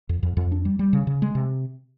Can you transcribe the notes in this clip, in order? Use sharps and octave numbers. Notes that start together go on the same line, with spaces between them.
F2
F2
F2
D4
G3
G3
C#3
C#3
G#3
C3